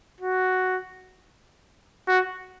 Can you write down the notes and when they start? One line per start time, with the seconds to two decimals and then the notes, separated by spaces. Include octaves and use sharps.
0.21 F#4
2.08 F#4